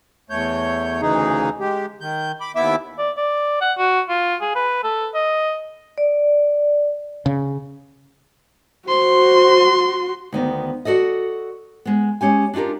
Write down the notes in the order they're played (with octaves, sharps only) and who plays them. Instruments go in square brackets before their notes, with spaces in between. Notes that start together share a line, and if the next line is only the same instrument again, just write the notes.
[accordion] E2 A3 C#5 G6
D2 C#3 E3 D#4 G#4
G#3 G4
D#3 G6
B5 D6
D#2 B3 E4 E5 D6 E6
[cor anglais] D5
D5
F#5
F#4
F4
G#4
B4
A4
D#5
[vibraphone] D5
[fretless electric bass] C#3
[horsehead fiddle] F#4 [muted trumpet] C5 [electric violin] C6
[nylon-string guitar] D2 D#3 B3
F#4 A4 D5 D#5
G#3 B3
G#3 C#4 G4 G#5
D4 D#4 F4 G4 A#4